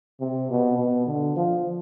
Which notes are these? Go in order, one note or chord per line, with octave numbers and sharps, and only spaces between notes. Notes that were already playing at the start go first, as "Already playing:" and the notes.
C3
B2
B2
D3
F3